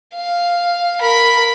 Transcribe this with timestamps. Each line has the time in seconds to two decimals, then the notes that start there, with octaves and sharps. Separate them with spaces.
0.15 F5
1.01 A#4 B5